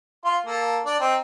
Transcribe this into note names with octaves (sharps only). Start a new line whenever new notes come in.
F4 C6
A#3 A4
D4 D5
C4 D#4